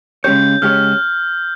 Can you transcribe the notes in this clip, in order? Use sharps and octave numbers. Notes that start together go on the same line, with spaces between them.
C#3 G#3 C#4 G4 C#5 G6
C#3 G#3 C#4 G4 C#5 F6